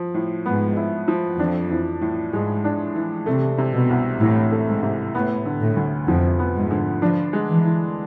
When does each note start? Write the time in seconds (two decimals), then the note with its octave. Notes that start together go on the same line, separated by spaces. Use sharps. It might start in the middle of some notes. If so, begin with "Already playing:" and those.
Already playing: F3
0.14 A2
0.45 G#2 B3
0.76 E4
1.08 F3
1.39 F2 D4
1.71 E3
2.01 A2
2.32 G#2 G#3
2.64 D4
2.96 E3
3.26 C3 A3
3.58 C3
3.74 B2
3.89 C2
4.20 A2 E3
4.52 A3
4.68 G#2
4.83 C3
5.15 A2 B3
5.45 D3
5.61 A2
5.76 D2
6.08 F2 F3
6.39 B3
6.55 G#2
6.71 D3
7.02 F3 D4
7.33 G#3
7.48 E3
7.65 E3